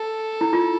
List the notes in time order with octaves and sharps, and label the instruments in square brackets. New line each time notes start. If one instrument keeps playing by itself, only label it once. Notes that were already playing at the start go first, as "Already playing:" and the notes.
Already playing: [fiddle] A4
[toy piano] E4
F4